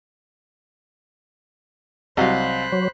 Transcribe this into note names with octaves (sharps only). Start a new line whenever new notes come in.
C2 F#3 F#4 C5 D#5 F5 B5 F#6
F#3